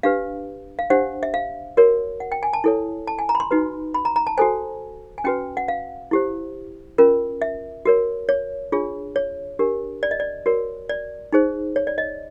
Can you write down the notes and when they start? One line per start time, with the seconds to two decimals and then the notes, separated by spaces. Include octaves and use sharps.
0.03 D4 G4 B4 F5
0.79 F5
0.90 D4 G4 C5 F#5
1.23 E5
1.34 F5
1.77 F#4 A#4 C#5
2.20 F#5
2.32 G5
2.43 G#5
2.53 A5
2.64 E4 A4 C#5
3.07 A5
3.19 G#5
3.29 A#5
3.35 B5
3.40 C6
3.51 D#4 F#4 B4
3.94 B5
4.05 A#5
4.16 A#5
4.27 A5
4.38 F#4 A4 C5 G#5
5.18 G#5
5.24 C#4 F#4 B4 G5
5.57 F#5
5.68 F5
6.11 E4 G4 C5
6.98 C#4 F4 A#4
7.42 E5
7.85 F#4 A#4 C#5
8.29 C#5
8.72 D4 F4 G#4 C#5
9.16 C#5
9.59 D4 G4 A#4
10.03 D5
10.11 D#5
10.20 D5
10.46 F#4 A#4 C#5
10.89 D5
11.33 D#4 G#4 C5
11.76 C#5
11.87 D5
11.98 D#5